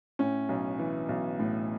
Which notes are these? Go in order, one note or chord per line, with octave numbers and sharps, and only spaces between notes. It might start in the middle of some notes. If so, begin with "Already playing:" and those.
A2 C#4
B1
E3
B1
A2